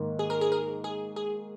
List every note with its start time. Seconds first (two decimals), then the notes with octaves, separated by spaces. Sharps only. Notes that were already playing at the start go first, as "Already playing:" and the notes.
Already playing: G#2 D#3 A#3
0.19 G#4
0.30 A#4
0.41 G#4
0.52 A#4
0.84 G#4
1.16 G#4